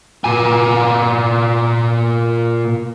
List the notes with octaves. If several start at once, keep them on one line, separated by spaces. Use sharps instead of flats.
A#2 G#5